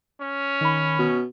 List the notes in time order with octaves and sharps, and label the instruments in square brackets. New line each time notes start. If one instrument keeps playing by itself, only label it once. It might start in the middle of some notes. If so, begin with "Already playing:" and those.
[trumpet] C#4
[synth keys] D#3 B5
[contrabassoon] B2